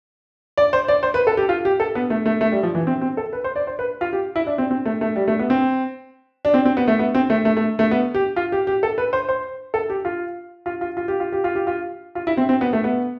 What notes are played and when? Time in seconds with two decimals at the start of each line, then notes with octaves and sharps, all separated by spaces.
0.58 D5
0.73 C5
0.88 D5
1.03 C5
1.14 B4
1.27 A4
1.37 G4
1.49 F4
1.65 G4
1.80 A4
1.95 B3
2.10 A3
2.26 A3
2.41 A3
2.52 G3
2.63 F3
2.75 E3
2.87 C4
3.01 C4
3.17 A4
3.33 B4
3.44 C5
3.56 D5
3.67 C5
3.79 B4
4.01 F4
4.13 G4
4.36 E4
4.47 D4
4.58 C4
4.71 C4
4.86 A3
5.01 A3
5.16 G3
5.28 A3
5.39 B3
5.50 C4
6.45 D4
6.54 C4
6.65 C4
6.77 B3
6.88 A3
6.99 B3
7.14 C4
7.30 A3
7.45 A3
7.57 A3
7.79 A3
7.91 B3
8.15 G4
8.36 F4
8.52 G4
8.67 G4
8.83 A4
8.98 B4
9.13 C5
9.29 C5
9.74 A4
9.90 G4
10.05 F4
10.66 F4
10.81 F4
10.97 F4
11.08 G4
11.20 F4
11.32 G4
11.44 F4
11.55 G4
11.67 F4
12.15 F4
12.27 E4
12.37 C4
12.49 C4
12.61 B3
12.73 A3
12.84 B3